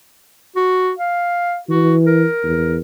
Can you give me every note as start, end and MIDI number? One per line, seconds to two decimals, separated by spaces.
0.56 0.92 66
0.99 1.58 77
1.69 2.25 52
1.69 1.96 66
2.06 2.79 70
2.44 2.78 40